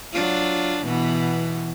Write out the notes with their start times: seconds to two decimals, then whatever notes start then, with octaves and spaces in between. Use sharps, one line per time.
0.12 F#3 D4 F4
0.85 B2 E3 B3